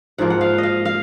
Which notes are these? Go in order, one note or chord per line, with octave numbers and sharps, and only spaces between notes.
G#2 F3 A#3 F#5
F#5
F5
D#5
F5
F5